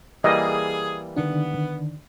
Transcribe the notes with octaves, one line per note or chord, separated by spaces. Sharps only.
E3 G3 A#3 G#4 D#5
D3 D#3 B3 D4